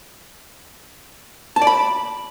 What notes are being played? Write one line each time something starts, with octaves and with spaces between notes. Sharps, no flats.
A5
D5
B5